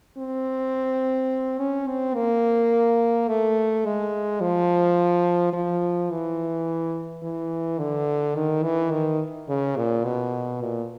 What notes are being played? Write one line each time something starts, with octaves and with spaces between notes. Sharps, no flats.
C4
C#4
C4
A#3
A3
G#3
F3
F3
E3
E3
D3
D#3
E3
D#3
C#3
A#2
B2
A#2